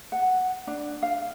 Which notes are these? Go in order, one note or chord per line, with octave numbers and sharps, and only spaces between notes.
F#5
D4
F5